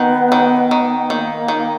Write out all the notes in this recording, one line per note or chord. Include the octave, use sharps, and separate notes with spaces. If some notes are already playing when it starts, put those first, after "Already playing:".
Already playing: D#3 B3
D#3
D#3
D#3 A#3
D#3